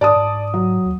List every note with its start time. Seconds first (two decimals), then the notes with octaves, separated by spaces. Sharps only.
0.01 G#2 D5 A5 D#6
0.16 G#2
0.54 F#3
0.86 D#2